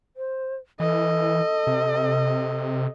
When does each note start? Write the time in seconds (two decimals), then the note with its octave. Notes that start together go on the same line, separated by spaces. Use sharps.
0.16 C5
0.80 E3 A4 D#5
1.67 C3